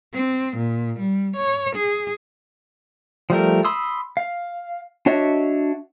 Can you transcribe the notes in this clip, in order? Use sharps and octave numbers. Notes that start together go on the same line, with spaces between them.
C4
A#2
G3
C#5
G#4
F3 G3 A3 A#4
B5 C6 D#6 E6
F5
D4 F#4 C#5 D#5 E5